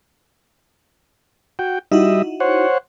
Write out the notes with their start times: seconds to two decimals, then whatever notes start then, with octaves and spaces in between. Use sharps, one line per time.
1.59 F#4 G5
1.92 G3 D#4 E4 F#4 D#5 E5
2.40 C5 C#5 F#5